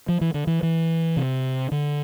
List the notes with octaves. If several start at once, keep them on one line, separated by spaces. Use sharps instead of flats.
F3
E3
D3
E3
E3
C3
D3